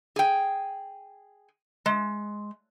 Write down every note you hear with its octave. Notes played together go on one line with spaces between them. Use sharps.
G#4 G5
G#3